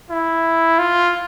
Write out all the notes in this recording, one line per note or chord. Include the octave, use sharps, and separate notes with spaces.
E4
F4